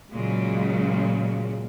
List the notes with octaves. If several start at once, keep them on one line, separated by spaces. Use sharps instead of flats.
A#2 C#3 F#3 G#3